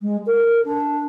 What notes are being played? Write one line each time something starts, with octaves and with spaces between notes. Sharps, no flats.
G#3
A#4
D4